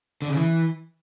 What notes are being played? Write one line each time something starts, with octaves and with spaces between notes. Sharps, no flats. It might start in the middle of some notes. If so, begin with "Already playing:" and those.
D3
C#3
E3